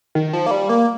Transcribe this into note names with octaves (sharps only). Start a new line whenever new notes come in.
D#3
F3
A#3
G3
A#3